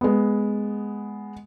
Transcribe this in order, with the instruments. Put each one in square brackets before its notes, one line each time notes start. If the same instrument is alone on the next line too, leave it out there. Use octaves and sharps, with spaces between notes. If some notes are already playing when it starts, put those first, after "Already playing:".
[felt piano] G#3 B3